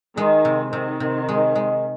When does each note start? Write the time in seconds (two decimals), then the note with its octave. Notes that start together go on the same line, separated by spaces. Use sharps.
0.17 D#3 G#3
0.45 C3
0.72 C3 D#3
1.00 C3
1.29 G#3
1.55 G#3